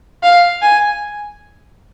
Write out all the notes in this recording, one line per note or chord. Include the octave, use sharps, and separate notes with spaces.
F5
G#5